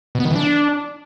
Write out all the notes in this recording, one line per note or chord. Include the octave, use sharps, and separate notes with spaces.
B2
B3
D#3
E3
D4